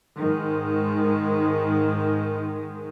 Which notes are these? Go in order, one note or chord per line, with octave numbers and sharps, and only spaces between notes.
G#2 D#3 G#3